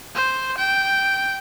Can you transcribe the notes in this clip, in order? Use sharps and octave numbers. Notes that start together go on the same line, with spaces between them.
C5
G5